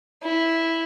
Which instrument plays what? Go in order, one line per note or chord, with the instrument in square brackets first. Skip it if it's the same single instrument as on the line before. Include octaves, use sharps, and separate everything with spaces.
[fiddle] E4